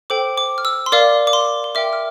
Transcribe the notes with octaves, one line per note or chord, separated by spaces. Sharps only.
A4 C5 G5 D6
D6
F6
E6
C6
A#4 D5 F5 D6
D6
C6
C6
A#4 E5 G5 D6
F6